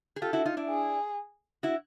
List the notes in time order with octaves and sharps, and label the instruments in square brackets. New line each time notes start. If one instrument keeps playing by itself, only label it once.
[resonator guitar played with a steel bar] G#4
[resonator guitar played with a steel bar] F4 G4 [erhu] A4
[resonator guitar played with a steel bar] E4 F#4
D#4 F4
D4 E4
[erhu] G#4
[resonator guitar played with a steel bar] E4 F#4